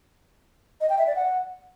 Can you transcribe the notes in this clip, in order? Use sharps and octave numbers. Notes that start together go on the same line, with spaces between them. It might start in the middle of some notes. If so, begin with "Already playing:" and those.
D#5
G5
E5
D5
F#5